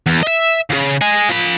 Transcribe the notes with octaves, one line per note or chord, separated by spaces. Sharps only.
E2
D#5 E5
D#2 C#3
D#5 G#5
F3 B5